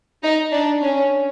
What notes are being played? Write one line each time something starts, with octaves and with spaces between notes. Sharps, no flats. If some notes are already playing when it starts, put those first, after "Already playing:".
D#4
D4
C#4